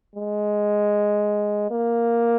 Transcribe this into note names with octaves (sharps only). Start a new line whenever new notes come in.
G#3
A#3